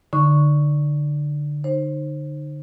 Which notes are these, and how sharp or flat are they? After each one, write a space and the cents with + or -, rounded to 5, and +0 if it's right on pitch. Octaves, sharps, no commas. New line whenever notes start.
D3 +0 D#4 +0 C#6 +0
D#4 -15 C5 +25